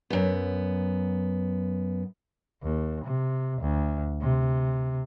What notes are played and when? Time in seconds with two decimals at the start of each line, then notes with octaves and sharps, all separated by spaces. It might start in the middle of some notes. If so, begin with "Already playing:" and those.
0.10 F#2 B3
2.62 D#2
3.05 C3
3.60 D2
4.21 C3